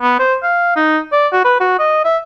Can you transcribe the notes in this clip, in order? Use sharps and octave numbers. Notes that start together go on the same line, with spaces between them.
B3
C5
F5
D#4
D5
F#4
B4
F#4
D#5
E5